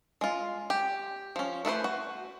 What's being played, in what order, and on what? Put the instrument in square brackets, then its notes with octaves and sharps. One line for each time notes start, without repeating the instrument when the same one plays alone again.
[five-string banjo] G#3 F4
G4
F3 C#4
A3 E4 B4 C5
F#4